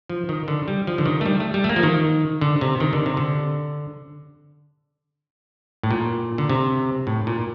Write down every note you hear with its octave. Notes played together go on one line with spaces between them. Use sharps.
F3
D#3
D3
G3
F3
D3
D#3
A3
G3
A3
G3
A3
A#3
F3
D#3
D3
C3
D#3
D3
C3
D3
A2
A#2
D3
C3
A2
A#2